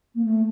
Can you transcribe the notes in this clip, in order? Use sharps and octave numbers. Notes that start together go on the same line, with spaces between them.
A#3
A3